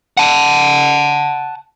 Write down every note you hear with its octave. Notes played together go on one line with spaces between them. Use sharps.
F#5 A5